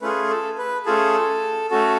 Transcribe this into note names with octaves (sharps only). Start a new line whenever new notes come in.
A3 C#4 F4 G#4 B4
A4
B4
A3 C#4 F4 G#4 A4
A3 C#4 F#4 A4